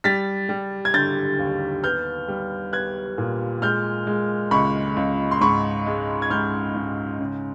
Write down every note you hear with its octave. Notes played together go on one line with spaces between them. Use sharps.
G3 A6 B6
G3
G#6
D3 G6 A6
D#2
B3 F6 G6
G3
B3 F#6 G#6
A#2
G#3 F6 G6
G#3
C#2 B5 C#6
C#2
C6
G#2 B5 C#6
G#3
G#6
G#2 F6 G6
G#2
C#3